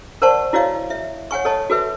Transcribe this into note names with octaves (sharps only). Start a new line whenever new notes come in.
A#4 C5 D5 F#5 A5 C#6
E4 F#4 C#5 D#5 F5
E5
C#5 F#5 G#5 C#6
A4 C#5 D#5 A5
F#4 A4 B4 E5